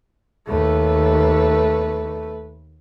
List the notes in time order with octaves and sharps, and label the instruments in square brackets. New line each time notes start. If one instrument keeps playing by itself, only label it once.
[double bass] D#2 [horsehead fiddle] A3 B4